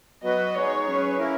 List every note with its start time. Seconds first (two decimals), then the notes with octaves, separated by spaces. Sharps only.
0.23 F#3 B3 F#4 B4 D#5
0.54 G#3 B3 D#4 G#4 C#5
0.86 F#3 C#4 G#4 B4
1.18 A#3 C#4 E4 A#4